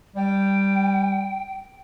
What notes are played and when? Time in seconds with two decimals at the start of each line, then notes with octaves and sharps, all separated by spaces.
0.16 G3 G5